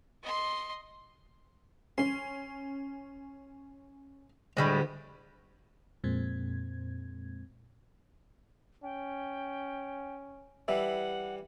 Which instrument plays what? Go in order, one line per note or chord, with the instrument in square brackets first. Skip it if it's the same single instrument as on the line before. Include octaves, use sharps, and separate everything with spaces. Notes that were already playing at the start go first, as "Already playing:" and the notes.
[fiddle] D#5 C6
[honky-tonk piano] C#4 [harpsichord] C6
[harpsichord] D2 [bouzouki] A2 G3 G#3
[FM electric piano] F2 A#2 G#3 C4 G#6
[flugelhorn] C#4 [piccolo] G5
[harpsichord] E3 G3 [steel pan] E5 [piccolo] F#5